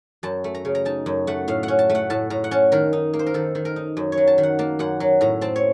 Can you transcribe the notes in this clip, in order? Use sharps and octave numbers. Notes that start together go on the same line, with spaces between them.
F#2 A5
A3
A#5
C#3
A#5
D#4 A5
F#2
A3 F#5
A2 F5
F#5
C#4
A5
A3
F#5
A2 A5
A2 A#5
F#5
C#4 A5
D#3 A#4
D#4
A#3
C5
A#4
D#3 A4
D#3
A#4
D#4
F#2
C#5
F#3
A5
D#3
F#5
A#3 A5
F#2 F#5
F#3
A2 A#5
C4 A5
C#5